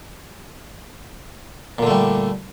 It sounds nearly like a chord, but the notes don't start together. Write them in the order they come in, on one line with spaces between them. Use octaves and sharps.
A#2 D3 A3 G3